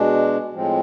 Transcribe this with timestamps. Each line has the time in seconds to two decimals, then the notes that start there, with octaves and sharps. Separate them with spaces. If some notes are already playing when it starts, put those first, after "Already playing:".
Already playing: B2 G#3 D4
0.53 A2 F3 G#3 C4